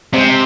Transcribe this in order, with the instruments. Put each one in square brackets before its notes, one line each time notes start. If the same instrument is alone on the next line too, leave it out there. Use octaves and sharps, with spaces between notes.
[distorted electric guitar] C3 [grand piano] G#3 C4